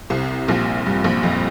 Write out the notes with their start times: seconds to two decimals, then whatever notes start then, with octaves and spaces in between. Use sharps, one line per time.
0.10 C2 C3
0.48 A#1 A#2
0.86 G2
1.04 A#1 A#2
1.23 F2